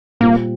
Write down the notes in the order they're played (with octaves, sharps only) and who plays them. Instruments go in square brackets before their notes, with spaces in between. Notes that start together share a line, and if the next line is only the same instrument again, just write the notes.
[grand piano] A#2 G3 C4 F4 [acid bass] A#3